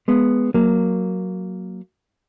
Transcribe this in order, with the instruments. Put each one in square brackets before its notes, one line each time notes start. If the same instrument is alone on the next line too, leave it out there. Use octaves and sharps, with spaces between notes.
[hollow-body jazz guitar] G#3 B3
F#3 A#3